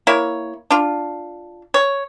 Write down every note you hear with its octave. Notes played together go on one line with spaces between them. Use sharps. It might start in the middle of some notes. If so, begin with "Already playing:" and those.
A#3 E4 C#5
D4 F4
C#5